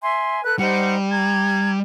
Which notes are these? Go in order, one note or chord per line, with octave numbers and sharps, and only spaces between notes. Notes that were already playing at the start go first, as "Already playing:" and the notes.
E5 G#5 C6
A4 B4 F#6
G3 D#4 C5 F#5
A#5 G#6